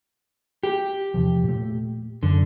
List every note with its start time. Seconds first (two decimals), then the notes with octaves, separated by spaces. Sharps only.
0.63 G4
1.14 E2 C3 F3
1.44 A#2 A3
2.23 F#1 F#2 D3